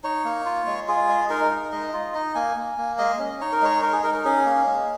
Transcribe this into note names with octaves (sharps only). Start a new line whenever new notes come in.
D#4 C#5
A#3
F4
G#3
F4 G#4
G#3
D#4 A#4
D#4
G#3 D#5
F4
D#4 D#5
A#3 G#5
A#3
A#3
G#3 D#5
C#4
D#4 C#5
A#4
G#3 C#5
D#4 A#4
G#4
D#4 A#4
A#4
C#4 G#4
A#3
G#3